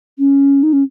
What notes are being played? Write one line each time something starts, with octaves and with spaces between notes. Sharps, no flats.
C#4
D#4
C#4